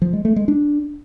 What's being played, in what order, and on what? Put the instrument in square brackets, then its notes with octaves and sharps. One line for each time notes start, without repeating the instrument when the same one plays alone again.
[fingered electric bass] F3
G#3
A3
G#3
D4